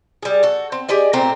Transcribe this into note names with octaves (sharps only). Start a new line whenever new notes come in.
G3 G#4
F#4 A4
C4
G4 G#4 D5 D#5
A#2 A3 C4 A#5